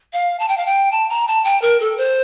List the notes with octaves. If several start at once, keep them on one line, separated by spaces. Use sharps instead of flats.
F5
A5
G5
F5
G5
A5
A#5
A5
G5
A#4
A4
C5